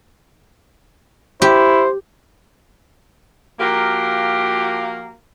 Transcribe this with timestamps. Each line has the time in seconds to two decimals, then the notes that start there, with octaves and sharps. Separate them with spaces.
1.42 E4 G4 C5
3.60 F3 A#3 F#4 G4 A#4 F5